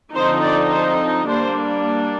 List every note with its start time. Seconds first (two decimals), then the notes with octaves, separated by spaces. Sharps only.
0.14 D3 F3 C4 D#4 C5
0.43 D5
0.71 C5
1.28 G3 A#3 D4 C5